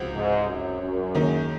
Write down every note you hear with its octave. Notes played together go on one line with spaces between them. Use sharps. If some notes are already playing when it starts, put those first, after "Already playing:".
Already playing: C#2 C3 F3 C4 F#4
G#2
F#2
F#2
D#2 D#3 G#3 D#4